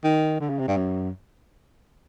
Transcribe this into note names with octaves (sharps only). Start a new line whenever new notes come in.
D#3
D3
C#3
C3
G2
F#2